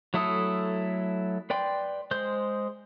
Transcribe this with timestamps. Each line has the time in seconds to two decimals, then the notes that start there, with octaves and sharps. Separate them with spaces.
0.14 F#3 A3 E4 A4 D#6
1.50 B4 D5 G5 C6
2.11 G#3 C5 G6